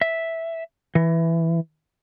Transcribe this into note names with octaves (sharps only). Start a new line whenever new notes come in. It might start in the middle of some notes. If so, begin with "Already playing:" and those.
E5
E3